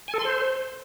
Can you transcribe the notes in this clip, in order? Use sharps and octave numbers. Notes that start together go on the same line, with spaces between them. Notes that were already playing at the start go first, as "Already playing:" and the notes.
G#5
A4
C6
C5